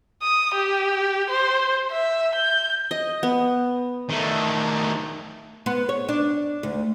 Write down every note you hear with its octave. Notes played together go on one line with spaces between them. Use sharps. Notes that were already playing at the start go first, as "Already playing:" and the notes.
D#6
G4
C5
E5
G6
D#5
B3
D#3 A3
B3
C#5
D4
D2